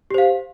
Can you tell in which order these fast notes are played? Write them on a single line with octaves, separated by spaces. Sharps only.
G4 C5 F5